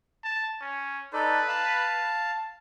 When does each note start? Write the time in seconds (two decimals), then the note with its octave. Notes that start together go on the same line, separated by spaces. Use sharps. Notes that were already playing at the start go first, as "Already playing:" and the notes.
0.24 A5
0.61 C#4
1.13 D#4 A4 B4 D5
1.48 F5 A5